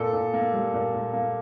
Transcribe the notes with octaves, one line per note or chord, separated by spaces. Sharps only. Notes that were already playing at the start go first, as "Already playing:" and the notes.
Already playing: A#2 A4
A#2
A#3
G3
A#2
A#2
A#3